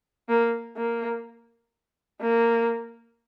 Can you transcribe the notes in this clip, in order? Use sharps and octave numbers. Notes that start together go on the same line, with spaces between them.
A#3
A#3
A#3